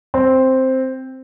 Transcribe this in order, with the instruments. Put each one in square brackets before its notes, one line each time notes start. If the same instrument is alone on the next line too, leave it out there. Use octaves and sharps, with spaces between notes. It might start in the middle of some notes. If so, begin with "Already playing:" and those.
[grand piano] C4